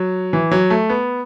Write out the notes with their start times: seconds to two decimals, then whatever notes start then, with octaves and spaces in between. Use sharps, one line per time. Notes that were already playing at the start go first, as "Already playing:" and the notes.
Already playing: F#3
0.33 E3
0.51 F#3
0.70 A3
0.90 B3